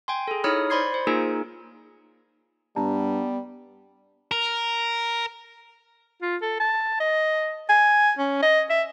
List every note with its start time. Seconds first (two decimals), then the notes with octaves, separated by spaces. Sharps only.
0.08 G5 G#5 C6
0.28 G#4 A4
0.44 D#4 E4 C#5 B5 D#6 F6
0.70 C5 D5 B5 C6 G#6 C7
0.94 C5
1.07 A#3 D#4 F4 G#4 A#4 G#5
2.76 G2 G3 B3 A5 A#5
4.31 A#4
6.22 F4
6.42 A4
6.60 A5
7.00 D#5
7.69 G#5
8.19 C#4
8.42 D#5
8.70 E5